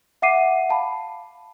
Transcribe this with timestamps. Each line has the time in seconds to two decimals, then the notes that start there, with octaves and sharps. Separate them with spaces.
0.22 E5 F#5 D6 C7 D#7
0.69 F5 A5 B5